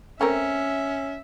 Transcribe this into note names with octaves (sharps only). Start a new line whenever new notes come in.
A3 C4 C#4 A#4 E5